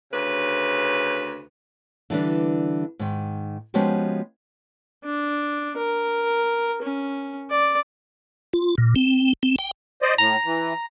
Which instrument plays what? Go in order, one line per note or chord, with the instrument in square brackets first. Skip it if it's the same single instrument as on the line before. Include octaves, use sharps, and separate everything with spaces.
[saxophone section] D2 C#3 B4
[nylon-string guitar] D3 E3 G3 D4
G#2 D#3
F3 G#3 B3 C#4 F#4 G4
[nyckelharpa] D4
A#4
C#4
D5
[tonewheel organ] F4
A#2
C4
C4
G5
[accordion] C5 D5 D#5
[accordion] A2 [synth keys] A#5
[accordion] E3